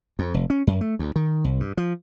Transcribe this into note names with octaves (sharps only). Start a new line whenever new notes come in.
F2
F1
C#4
F#2
A3
D2
D#3
C2
G2
F3